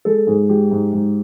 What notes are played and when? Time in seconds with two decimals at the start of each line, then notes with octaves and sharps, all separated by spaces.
0.05 G#3 A4
0.27 G#2 G#4
0.49 G#3 G4
0.71 G#2
0.93 G#2